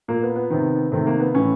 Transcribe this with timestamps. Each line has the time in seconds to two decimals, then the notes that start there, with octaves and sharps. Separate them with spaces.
0.08 A#2 A#3
0.23 B3
0.36 B3
0.50 C3 D#3
0.92 C3 D#3 A3
1.07 A#3
1.20 B3
1.34 A2 E3 C#4